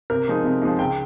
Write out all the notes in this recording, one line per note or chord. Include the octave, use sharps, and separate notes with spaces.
C3 A#4
F3 G#3 D#4
C3
F3 G#3 D#4
C#2 G5